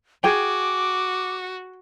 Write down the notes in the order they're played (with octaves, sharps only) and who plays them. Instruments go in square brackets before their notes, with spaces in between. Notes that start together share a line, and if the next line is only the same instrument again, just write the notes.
[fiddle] F#4 [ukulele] G#4 G5 [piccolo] D6